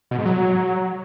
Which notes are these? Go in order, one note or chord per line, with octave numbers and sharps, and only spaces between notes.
B2
G#2
F#3